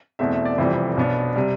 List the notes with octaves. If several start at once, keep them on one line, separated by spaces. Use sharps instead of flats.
E2 B2 A3 C4 E5
E5
D5
F1 F2 E3 G3 C5
B1 B2 B3 D4
C3 G3